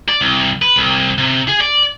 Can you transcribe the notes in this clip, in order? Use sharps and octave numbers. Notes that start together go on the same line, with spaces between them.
D5
C2
B4
C2
C3
G#4
D5